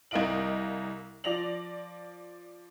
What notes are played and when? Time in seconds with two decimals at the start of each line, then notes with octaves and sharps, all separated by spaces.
0.11 C2 A#4 D#5 F5 D7 F#7
1.24 F3 D5 A#6 F7 F#7